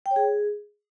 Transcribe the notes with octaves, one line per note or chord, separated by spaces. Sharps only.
G5
C#5
G#4